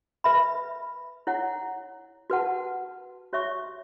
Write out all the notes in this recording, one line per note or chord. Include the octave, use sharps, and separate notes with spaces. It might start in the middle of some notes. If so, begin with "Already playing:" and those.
B4 E5 B5
E4 C#5 F#5
F#4 B4 F#5 A5
F#4 C#5 E5 C#6